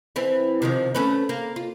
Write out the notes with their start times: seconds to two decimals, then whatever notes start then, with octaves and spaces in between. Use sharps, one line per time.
0.16 E3 C4 E4
0.62 C3 D#3 F3
0.95 A3 C#4 B4
1.29 A#3
1.56 F4